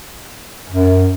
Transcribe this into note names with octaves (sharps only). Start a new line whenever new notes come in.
F#2